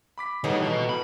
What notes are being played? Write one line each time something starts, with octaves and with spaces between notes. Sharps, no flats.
B5 D6 B6
A2 D#3 G3 B3 D#4 G#4 C#5
E3 F#4 D#5 A#5
B2 B5